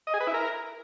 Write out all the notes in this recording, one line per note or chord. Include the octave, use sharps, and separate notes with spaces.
D#5
G#4
B4
E4
A#4